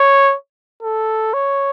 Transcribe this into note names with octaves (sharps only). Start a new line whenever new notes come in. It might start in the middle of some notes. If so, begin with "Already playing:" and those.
Already playing: C#5
A4
C#5